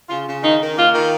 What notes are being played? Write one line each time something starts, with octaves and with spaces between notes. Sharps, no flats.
C#3 F4
C#3
D#3 D#4
D#3
A#3 F4
D#3